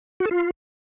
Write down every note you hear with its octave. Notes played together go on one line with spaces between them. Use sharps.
F#4
A4
F4